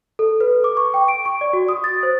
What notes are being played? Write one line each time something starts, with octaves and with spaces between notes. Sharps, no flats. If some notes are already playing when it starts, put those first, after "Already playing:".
A4
B4
D6
C#6
G5
D7
C#6
D5
F#4
D#6
A6
C5